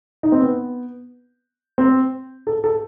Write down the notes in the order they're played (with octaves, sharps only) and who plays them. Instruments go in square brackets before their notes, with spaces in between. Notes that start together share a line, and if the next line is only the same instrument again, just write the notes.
[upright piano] D#4
C4
B3
C4
A4
A4